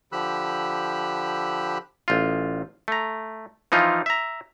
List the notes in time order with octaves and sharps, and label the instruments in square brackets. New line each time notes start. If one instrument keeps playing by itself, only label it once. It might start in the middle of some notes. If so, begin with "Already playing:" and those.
[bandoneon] D3 F3 G4 B5 E6 F#6
[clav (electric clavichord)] A1 F4
A3 A#5
E3 F3 D#4 F4
E5 A#5